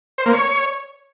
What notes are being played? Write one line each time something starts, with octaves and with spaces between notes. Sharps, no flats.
C5
A#3
C#5